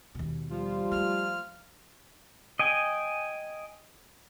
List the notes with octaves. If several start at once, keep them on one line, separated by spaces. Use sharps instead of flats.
D#2 B2
F3 G3 F4
A3 F6
D#5 G5 G#5